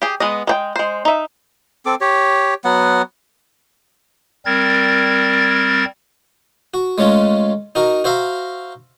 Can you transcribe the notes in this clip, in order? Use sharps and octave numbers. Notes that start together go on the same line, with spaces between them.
G4 G#4
G#3 B3 D#5
G#3 C5 G5
G#3 C5
D#4 E5
C4 A4 D6
G4 C#5
F#3 B3 F#5
G3 C4 A#4 G#6 A6
F#4
G#3 A3 C#4 F4
D#4 F#4 A#4
F#4 C5 E5 F5 A#5